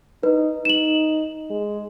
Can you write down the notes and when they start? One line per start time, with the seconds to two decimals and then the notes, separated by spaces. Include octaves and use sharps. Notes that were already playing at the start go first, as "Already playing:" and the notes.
0.23 D#4 B4
0.65 D#4 E7 F#7
1.50 G#3